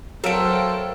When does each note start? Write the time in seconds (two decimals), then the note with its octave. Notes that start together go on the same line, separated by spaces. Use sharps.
0.24 F#3 A3 A4 A#4 C5 F5 G5 D7